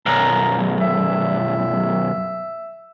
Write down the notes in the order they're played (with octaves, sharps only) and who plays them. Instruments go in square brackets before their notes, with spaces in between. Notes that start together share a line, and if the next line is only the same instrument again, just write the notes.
[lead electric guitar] B1 F#2 [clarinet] A#5
[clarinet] E5